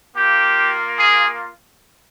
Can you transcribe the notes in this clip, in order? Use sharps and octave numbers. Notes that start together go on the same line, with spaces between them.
A#3 F4 G4
G#4